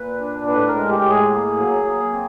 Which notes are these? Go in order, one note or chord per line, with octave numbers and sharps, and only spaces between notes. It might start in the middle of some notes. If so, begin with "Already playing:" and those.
Already playing: A#2 B4
D4
A2 B4
A#4
G#3
G4
A2
G#4
A#3
F#3
A#3
C4